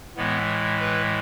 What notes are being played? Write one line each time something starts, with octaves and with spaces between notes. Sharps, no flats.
A2 E3 G#3 B3
B4